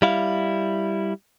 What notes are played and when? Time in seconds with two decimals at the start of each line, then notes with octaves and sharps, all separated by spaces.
0.02 G3 E4 F5